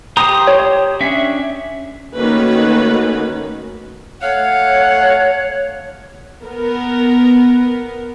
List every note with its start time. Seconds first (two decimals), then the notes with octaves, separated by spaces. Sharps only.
0.17 G4 C5 A#5 D#6
0.47 C#5
1.01 C#4 D4 E5
2.14 D#3 A3 A#3 C#4 F#4 B4
4.22 A3 C#5 F5 F#5
6.44 B3 A#4